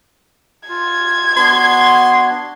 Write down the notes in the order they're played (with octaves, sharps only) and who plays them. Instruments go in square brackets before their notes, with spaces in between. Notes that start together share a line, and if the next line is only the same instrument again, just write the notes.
[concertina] F4 [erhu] G#6
[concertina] B3 D4 F#4 [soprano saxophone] C6